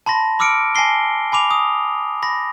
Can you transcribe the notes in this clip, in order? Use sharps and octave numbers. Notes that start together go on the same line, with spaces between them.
A5 B5 C6 A#6
B5 D6 E6 F6 C#7 D7
G#5 A5 A#6 C7 G7
G#5 B5 D6 F7
D#6
B5 A#6